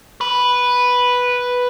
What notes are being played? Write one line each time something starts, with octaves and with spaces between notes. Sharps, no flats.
B4